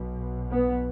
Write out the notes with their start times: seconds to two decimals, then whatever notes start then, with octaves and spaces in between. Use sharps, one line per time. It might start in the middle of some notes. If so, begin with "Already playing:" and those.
Already playing: B1 B2
0.50 B3